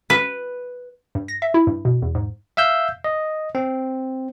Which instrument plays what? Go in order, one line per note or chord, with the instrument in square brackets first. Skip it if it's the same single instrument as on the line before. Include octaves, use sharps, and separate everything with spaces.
[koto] B4
[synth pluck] G2
A#6
E5
E4
G2
B2
E2
G#2
[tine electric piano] E5 F5 E6 G6
D#5
C4